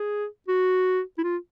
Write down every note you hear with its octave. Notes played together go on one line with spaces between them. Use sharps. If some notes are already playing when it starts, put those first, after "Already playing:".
Already playing: G#4
F#4
E4
F4